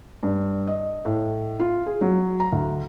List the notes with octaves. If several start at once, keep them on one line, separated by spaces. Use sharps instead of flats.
G2
D#5
A2
F4
G#4
F#3
A#5
D2